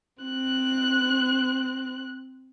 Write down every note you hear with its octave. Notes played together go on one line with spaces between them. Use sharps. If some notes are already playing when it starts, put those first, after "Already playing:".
C4 F#6